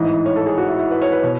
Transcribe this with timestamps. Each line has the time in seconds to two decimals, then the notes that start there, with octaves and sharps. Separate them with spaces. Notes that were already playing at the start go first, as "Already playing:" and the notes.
Already playing: A1 G#2 E3 D#5
0.26 C#5
0.36 A4
0.46 G#4
0.58 F#4
0.68 E4
0.79 E4
0.90 B4
1.02 C#5
1.12 B4
1.23 B2 C#5